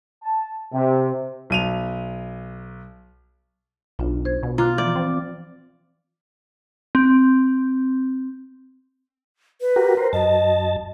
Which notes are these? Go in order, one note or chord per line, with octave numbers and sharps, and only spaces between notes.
A5
C3
B1 D#7 F7
B1 D4 F4
C5 G#6
B2
F4 A#5 D6 F#6
E3 F3 D5
C4
C4
B4
F#4 G4 A#4
A#4 C5
F#2 D#5 A5